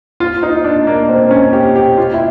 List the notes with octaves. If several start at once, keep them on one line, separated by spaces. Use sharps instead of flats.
F4
D#4
D4
A#3
C4
C#4
G4
G4
F4
E4